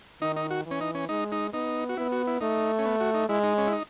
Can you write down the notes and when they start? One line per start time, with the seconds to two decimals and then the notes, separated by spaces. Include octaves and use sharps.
0.22 D#3 D#4
0.36 D#4
0.51 F#4
0.66 E3
0.71 C#4
0.81 D#4
0.95 C#4
1.09 G#3 D#4
1.32 D#4
1.53 B3 D#4
1.89 F#4
1.97 B3 E4
2.12 F#4
2.27 E4
2.41 A3 D#4
2.79 C#4
2.86 B3
3.00 F#4
3.14 D#4
3.29 G#3 E4
3.43 D#4
3.58 C#4
3.67 E4
3.73 D#4